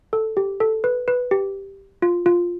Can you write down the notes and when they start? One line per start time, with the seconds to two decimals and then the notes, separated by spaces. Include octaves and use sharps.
0.13 A4
0.37 G4
0.60 A4
0.84 B4
1.08 B4
1.31 G4
2.02 F4
2.26 F4